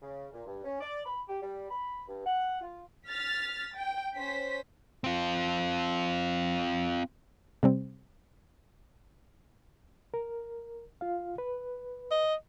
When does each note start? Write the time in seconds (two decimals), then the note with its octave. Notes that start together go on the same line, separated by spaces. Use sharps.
0.02 C#3
0.33 A#2
0.46 G2
0.64 C#4
0.80 D5
1.05 B5
1.28 G4
1.41 G3
1.70 B5
2.07 G2
2.25 F#5
2.61 F4
3.07 F6 A6 B6
3.75 G5
4.15 C#4 C5 B6
5.04 C4 F4
7.63 C3 G3 C4
10.14 A#4
11.01 F4 F5
11.38 B4
12.11 D#5